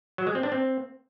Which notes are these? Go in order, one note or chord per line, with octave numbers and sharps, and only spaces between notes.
F#3
G#3
C4
D4
C4